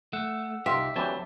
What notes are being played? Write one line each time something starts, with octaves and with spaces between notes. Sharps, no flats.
A3 F#5 E6
C2 D#4 F4 G4 E5
D2 E3 F#3 C4 G4 C#5 A5